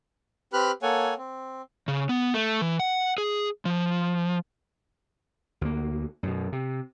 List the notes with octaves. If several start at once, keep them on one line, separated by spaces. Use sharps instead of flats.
C4 G4 B4 B5 F6 F#6
A#3 A4 C#5 F#5 G#5
C4
C#3
B3
A3
E3
F#5
G#4
F3
D2 A#3
F#2 B2
C3